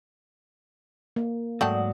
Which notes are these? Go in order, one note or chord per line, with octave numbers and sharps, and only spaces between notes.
A#3
G#2 F#3 A3 D5 F#5 G5 A5 D#6